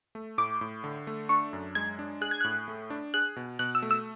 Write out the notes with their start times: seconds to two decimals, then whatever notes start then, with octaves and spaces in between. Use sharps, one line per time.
0.15 A3
0.38 A2 D6
0.61 A2
0.84 D3
1.07 A3
1.29 D4 C#6
1.53 F#2
1.75 G#3 G#6
1.99 D4
2.21 G#4 F#6
2.31 G#6
2.41 A2 F#6
2.68 A3
2.90 D4
3.14 G#4 F#6
3.36 B2
3.59 B2 F#6
3.75 E6
3.82 A3
3.91 E6